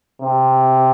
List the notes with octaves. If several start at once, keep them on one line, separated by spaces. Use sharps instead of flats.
C3